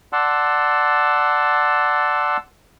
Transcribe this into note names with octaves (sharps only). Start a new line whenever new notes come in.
D5 F#5 A5 C6 E6